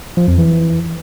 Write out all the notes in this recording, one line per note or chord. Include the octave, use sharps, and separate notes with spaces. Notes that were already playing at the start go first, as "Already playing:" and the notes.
F3
F2
E3